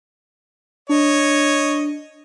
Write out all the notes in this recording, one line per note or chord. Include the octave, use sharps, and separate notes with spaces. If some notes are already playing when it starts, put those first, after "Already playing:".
D4 C#5 D#5